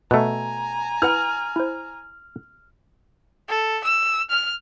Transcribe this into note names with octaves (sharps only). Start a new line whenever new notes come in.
B2 A3 G#5 A#5 F#6
E4 B4 F#5 F6
E4 C5
A4
E6
F6